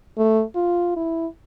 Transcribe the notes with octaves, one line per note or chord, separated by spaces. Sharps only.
A3
F4
E4